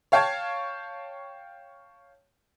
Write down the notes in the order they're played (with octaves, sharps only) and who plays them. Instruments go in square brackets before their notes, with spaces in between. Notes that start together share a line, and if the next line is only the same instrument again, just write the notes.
[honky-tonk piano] C#5 F5 G5 A5 C#6 G#6